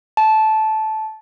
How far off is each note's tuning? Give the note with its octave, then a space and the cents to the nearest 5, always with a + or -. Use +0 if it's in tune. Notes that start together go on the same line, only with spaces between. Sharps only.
A5 -15